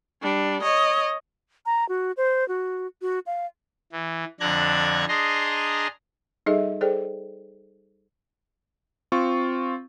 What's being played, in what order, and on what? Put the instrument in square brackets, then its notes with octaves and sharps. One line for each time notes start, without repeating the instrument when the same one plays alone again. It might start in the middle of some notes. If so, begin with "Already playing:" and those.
[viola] G3 D4
C#5 D#5
[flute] A#5
F#4
C5
F#4
F#4
F5
[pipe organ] E3
F2 D3 D4 A#5 F#6 G#6
D4 G#4 D#5 A#5 C6
[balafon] G3 D#4 G#4 A4 D#5 E5
G#4 A4 C5 D5 G5
[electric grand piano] C4 F4 C#6